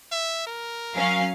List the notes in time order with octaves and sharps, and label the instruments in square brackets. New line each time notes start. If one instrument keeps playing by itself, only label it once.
[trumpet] E5
A#4
[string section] F#3 C#4 F5